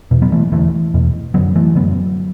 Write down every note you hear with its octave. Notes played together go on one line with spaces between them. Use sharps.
E2 B2
F#3 B3
E3 A3
E2 D3 E3 A3
E2 B2
F#2 D3 F#3 B3
E3 A3
F#2 D3 F#3 B3